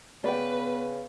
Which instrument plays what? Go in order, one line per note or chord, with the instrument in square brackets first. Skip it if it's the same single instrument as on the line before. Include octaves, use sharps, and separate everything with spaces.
[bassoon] C#3 [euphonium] B3 [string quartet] B4 [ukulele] D5 G5